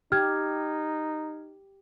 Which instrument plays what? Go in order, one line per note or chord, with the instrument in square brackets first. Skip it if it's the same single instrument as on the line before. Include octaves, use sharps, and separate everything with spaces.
[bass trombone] D#4 [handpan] G4 [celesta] F6 G#6